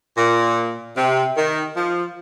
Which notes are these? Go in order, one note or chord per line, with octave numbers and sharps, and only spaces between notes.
A#2
C3
D#3
F3